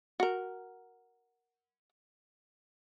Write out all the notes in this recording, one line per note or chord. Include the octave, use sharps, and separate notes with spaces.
F#4 A#4